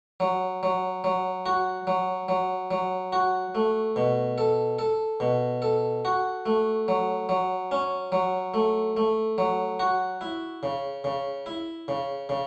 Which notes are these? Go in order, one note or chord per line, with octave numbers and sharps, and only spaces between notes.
F#3
F#3
F#3
F#4
F#3
F#3
F#3
F#4
A3
B2
A4
A4
B2
A4
F#4
A3
F#3
F#3
C#4
F#3
A3
A3
F#3
F#4
E4
C#3
C#3
E4
C#3
C#3